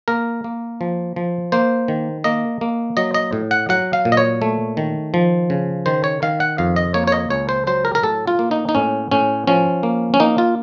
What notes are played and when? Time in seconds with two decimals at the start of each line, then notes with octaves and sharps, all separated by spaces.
0.08 A#3 A#4
0.44 A#3
0.81 F3
1.16 F3
1.52 A#3 C5
1.88 D#3
2.24 A#3 D#5
2.61 A#3
2.97 F#3 D#5
3.14 D#5
3.33 A2
3.51 F#5
3.69 F#3 F#5
3.93 F5
4.05 A#2
4.12 D#5
4.17 C#5
4.42 A3
4.77 D#3
5.14 F3
5.50 C#3
5.86 D#3 C5
6.04 C#5
6.22 D#3 F5
6.40 F#5
6.58 F2 F5
6.76 D#5
6.94 A#3 C#5
7.07 C#5
7.12 D#5
7.30 C#2 C#5
7.49 C5
7.67 F#3 C5
7.85 A#4
7.95 A#4
8.03 A2 A4
8.27 F4
8.39 A#3
8.51 D#4
8.69 D#4
8.75 A2 C#4
9.12 A2 C#4
9.47 F3 C#4
9.83 A#3
10.14 C#4
10.20 A#3 D#4
10.38 F4